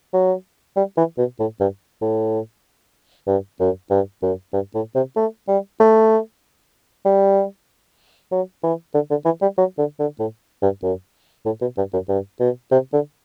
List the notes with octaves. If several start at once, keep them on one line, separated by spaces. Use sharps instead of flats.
F#3
G3
E3
B2
A2
G2
A2
G2
F#2
G2
F#2
G2
A2
C3
A3
G3
A3
G3
F#3
E3
D3
D3
E3
G3
F#3
D3
D3
A2
G2
F#2
A2
B2
G2
F#2
G2
B2
C3
D3